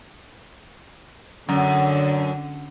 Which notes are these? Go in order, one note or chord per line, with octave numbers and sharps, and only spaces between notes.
F#2 D3